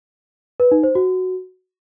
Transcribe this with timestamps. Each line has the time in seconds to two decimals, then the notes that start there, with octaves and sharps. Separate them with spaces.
0.60 B4
0.72 D#4
0.83 C5
0.95 F#4